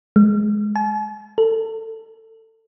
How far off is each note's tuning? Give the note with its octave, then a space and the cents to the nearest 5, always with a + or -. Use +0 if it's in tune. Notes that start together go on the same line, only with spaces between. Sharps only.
G#3 +10
G#5 +45
A4 +20